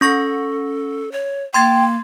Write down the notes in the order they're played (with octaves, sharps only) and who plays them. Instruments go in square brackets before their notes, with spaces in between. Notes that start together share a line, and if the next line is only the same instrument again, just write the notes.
[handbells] C#4 C#6 A#6 [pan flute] A4
[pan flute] C#5
[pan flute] A#3 [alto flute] G5 [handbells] C6 G#6 A6